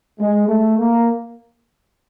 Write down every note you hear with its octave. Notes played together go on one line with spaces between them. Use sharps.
G#3
A3
A#3